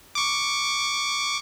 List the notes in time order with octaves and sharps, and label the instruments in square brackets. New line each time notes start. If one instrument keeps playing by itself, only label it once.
[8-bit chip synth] C#6 D6